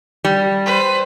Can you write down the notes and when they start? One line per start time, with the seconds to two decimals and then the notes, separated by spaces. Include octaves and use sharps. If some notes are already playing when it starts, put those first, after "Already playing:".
0.25 G3
0.66 B4 C5